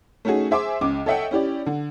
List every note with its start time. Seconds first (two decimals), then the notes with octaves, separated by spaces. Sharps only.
0.25 A3 C#4 D#4 F#4 G#4
0.51 G#4 C5 E5 G#5 C6 D6
0.81 C#2 C#3 D6
1.06 A4 C#5 D#5 E5 F#5 G5
1.31 C#4 E4 G4 D5
1.66 D3